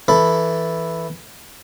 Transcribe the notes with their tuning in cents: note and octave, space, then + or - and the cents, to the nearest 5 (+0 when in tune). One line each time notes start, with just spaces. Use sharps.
E3 +0 A4 +0 B5 +0